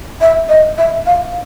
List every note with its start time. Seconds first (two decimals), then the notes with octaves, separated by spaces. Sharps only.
0.21 E5
0.49 D#5
0.78 E5
1.06 F5